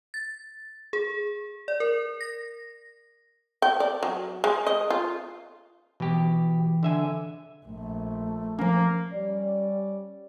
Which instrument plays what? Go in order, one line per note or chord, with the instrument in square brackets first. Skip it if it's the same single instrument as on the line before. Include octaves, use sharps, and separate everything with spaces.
[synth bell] A6
G#4
D5
A#4
A#6
[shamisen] G5
D5
F#3
G#3
D#5
F4
[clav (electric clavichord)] B2 G4 [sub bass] E3
[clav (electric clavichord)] D3 E5 G#5
[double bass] A#1 [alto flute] A3
[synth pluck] F3 C#4 [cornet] A#3
[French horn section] G3 C#4 D5